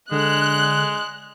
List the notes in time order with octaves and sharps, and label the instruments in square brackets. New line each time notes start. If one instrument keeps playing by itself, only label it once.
[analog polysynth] D3 [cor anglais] G#3 [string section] F#6